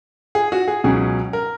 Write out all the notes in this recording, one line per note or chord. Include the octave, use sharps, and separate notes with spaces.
G#4
F#4
G#4
C#2 B2 F#3 C#4 G#4
A#4